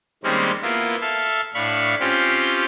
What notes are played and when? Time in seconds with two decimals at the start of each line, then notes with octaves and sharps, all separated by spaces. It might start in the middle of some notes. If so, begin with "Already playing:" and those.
0.23 D#3 G3 G#3 A#3 C4 C#4
0.62 A#3 B3 E4 F4
1.01 A4 E5 F5
1.54 A2 D4 F5 B5 C#6
2.00 C4 C#4 F4 G4